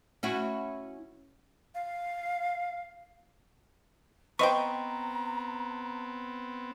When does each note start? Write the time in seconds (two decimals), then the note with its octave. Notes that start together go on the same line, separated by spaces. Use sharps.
0.23 C#4 E4 F#4
1.75 F5
4.39 B3 C4 B4 C5 D#5 G5 A#5 C#6